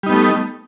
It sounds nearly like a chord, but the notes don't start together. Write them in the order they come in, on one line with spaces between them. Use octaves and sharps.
G3 D#4 B3 A3